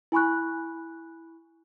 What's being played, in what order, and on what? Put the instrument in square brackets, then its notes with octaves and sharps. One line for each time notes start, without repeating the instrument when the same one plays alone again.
[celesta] E4 G#5 B5 C#6 F#6